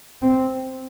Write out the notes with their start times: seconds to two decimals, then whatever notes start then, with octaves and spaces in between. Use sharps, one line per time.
0.22 C4